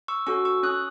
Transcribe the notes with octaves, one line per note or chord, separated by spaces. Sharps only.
C#6 E6
C#4 F#4 A4 C#6 E6
C#6 E6
C#4 D#6 F#6